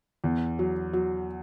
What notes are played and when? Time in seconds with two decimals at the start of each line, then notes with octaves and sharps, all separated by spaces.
0.24 E2
0.59 F#3
0.93 F#3